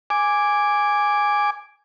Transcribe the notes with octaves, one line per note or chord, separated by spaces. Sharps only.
G#5 D6